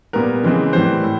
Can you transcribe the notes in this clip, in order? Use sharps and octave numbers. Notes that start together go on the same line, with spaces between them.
A#2 G3 B3 A#4
C#3 E3 G#3 C4
A2 E3 G3 C4 C5
A2